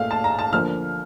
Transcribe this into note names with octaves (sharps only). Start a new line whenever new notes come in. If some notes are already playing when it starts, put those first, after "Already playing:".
Already playing: A#2 A3 F5
A5
A#5
A5
D3 F3 A#3 F6